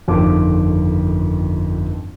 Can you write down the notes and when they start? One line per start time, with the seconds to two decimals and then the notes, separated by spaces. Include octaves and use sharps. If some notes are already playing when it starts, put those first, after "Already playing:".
0.08 G1 F2 D#3 D6